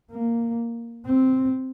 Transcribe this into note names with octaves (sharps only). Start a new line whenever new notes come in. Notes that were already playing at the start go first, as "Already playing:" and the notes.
A#3
C4